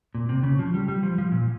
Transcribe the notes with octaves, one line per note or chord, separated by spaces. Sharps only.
A#2
C3
C#3
F3
G3
G3
F3
F3
A#2